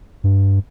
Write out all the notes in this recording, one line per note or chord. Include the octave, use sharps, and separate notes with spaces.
G2